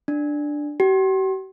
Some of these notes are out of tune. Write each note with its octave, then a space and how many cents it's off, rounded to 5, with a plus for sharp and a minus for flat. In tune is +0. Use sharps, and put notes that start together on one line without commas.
D4 +5
G4 -45